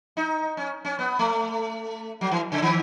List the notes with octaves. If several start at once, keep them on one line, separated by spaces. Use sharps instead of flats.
D#4
C#4
C#4
B3
A3
F#3
E3
C#3
D#3